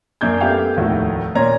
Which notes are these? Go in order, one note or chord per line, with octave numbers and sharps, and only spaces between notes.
F#2 A#3 D4 G6 G#6
A3 B3 G4 E5 F5 G5
F1 D#2 A2 F#4
A#2 C#4 A#5 G#6